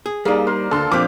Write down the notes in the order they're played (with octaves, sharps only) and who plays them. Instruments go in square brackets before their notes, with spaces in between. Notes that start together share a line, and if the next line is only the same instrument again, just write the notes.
[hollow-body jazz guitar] G#4
[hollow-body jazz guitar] G3 D#4 [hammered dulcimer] A#3 D5 [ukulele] G#4 F5
[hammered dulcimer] A#4 [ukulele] C5
[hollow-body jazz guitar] D2 [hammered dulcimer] D3 [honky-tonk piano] A4 C6
[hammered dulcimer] A#2 G4 [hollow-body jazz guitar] F3 C4 [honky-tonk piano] D6